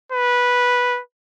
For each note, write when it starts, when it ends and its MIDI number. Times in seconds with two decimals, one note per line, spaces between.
0.12 1.01 71